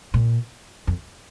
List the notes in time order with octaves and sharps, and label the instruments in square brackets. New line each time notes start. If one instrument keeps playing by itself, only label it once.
[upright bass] A#2
F2